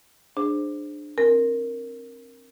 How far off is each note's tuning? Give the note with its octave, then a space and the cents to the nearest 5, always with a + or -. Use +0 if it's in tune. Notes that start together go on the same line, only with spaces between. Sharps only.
D4 +20 G#4 +0 C5 +0
C4 +30 A#4 +0